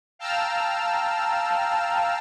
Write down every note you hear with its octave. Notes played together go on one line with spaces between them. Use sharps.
F5 G5 A5 A#5 E6 F6